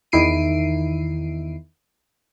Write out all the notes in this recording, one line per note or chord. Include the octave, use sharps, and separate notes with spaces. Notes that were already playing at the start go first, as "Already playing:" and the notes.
E2 D#3 E4 C7 D7 D#7